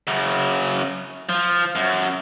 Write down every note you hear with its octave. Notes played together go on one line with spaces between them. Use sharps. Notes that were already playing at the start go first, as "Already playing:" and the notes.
F#2 C#3
F3
F#2